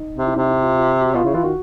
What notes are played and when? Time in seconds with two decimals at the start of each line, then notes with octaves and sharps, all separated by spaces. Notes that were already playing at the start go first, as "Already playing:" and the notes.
Already playing: D#4
0.16 C3
0.26 E4
0.36 C3 D#4
0.49 E4
0.62 F4
0.75 F4
1.01 F#4
1.15 B2 F4
1.24 C#3 E4
1.34 E3 F4
1.43 D#3 F#4